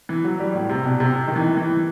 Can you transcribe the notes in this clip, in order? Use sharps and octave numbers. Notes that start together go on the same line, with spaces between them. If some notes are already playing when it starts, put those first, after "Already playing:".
E3
F#3
G3
A2
C3
B2
C3
C3
D#3
E3
E3